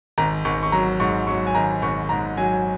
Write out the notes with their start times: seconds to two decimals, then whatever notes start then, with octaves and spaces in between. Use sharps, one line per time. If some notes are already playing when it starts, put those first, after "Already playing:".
0.18 G#1 A#5
0.45 G#1 C#6
0.63 C#6
0.72 F#3 A#5
1.00 G#2 C#6
1.27 F#3 C#6
1.47 G#5
1.55 G#1 A#5
1.82 G#1 C#6
2.09 G#2 A#5
2.37 F#3 G#5